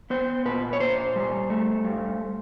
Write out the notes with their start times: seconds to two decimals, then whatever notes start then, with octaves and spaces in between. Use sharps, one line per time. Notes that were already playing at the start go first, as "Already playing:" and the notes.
0.10 B3 C5
0.45 A#2 B4
0.73 C#5
0.80 A#2 C5
1.16 G3
1.50 A3
1.85 G2